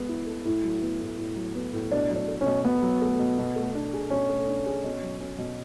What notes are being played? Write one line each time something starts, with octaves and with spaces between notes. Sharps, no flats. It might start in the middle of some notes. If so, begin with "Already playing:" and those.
Already playing: G#3 B3
E4
A4
A2 E4
F#3
B3
A2
A2
F#3
B3
A2
B2 D4
F#3
D4
A3
C#4
B2
B2 B3
F#3
A3
B2
B2
A3
D4
G#4
B2 C#4
A3
D4
G#4
B2
F#3
C#4
B2